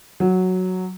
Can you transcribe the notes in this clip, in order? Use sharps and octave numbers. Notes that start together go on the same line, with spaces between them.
F#3